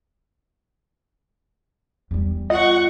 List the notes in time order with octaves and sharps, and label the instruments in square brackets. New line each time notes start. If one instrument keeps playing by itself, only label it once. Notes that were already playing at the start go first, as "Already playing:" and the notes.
[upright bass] E2 G3
[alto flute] F4 [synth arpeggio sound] D#5 [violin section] F#5 C#6